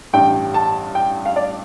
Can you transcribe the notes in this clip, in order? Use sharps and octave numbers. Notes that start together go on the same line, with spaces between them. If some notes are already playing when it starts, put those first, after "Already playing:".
A1 G2 G3 G5
A5
G5
F5
D5